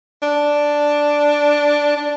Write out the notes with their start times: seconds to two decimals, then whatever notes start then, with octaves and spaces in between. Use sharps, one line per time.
0.22 D4
1.97 D4